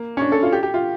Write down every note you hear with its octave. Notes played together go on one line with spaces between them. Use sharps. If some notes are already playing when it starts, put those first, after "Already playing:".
Already playing: A#3
C#4
D4
A4
F4
G4
G4
F4